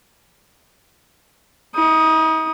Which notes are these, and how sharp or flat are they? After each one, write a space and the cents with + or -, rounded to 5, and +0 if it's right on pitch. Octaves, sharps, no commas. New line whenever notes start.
D#4 +45 D#6 +0